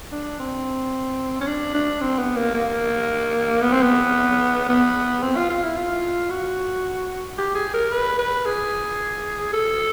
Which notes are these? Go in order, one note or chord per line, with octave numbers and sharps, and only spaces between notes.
D4
C4
C#4
D4
D4
C4
B3
A#3
A#3
B3
C4
B3
B3
C4
F4
F4
E4
F4
F#4
G4
G#4
A#4
B4
B4
G#4
A4